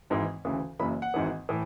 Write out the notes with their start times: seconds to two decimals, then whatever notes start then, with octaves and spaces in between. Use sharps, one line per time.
0.10 G#1 G#2 E3
0.45 D2 C#3 E3
0.79 F#1 F#2 C#3 E3 B5
1.02 F#5
1.14 G#1 G#2 E3
1.49 A2 E3